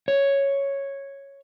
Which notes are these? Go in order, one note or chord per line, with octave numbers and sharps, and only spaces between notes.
C#5